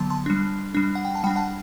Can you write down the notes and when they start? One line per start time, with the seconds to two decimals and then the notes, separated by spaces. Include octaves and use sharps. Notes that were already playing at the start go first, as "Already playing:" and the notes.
Already playing: D3 F#3 B3 A5 C6
0.10 A5 C6
0.26 G3 D4
0.75 G3 D4
0.95 F#5
1.05 G5
1.15 A5
1.24 G3 G5 B5
1.27 D4
1.36 F#5 A5